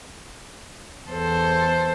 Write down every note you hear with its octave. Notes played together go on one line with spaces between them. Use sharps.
E2 A4 C5